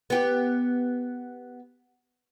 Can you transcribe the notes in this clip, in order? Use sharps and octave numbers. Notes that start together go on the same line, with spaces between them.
B3 G4